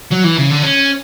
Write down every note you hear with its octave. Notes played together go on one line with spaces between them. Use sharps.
F#3
E3
C#3
D3
C#4